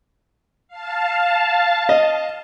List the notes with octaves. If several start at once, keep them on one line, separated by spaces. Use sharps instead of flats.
F5 A5
D#5